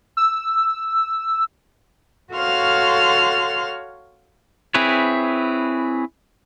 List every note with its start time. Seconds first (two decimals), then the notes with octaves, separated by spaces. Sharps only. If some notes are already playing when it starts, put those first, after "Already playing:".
0.17 E6
2.34 F#4 A4 C#5 F5 C6 F6
4.74 C4 E4 G#4 B4 C#5